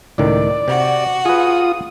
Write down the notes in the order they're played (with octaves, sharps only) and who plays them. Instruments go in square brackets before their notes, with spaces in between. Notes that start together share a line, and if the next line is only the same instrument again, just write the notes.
[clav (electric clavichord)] C#2 A2 D#3 [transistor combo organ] D5
[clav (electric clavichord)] C3 [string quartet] F#4
[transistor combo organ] F4 D#6 [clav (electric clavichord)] G#4 B4